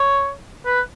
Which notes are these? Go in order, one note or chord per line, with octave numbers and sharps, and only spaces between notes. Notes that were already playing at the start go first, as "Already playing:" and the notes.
Already playing: C#5
B4